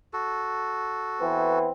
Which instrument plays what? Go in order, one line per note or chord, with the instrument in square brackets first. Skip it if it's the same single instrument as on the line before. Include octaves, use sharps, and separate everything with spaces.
[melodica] F#4 A4
[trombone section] E3 B3 C4